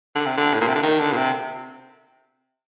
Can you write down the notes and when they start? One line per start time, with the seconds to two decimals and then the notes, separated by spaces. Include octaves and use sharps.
0.15 D3
0.26 C3
0.37 D3
0.53 A2
0.61 A#2
0.68 C3
0.75 D3
0.83 D#3
0.99 D3
1.12 A#2
1.17 C3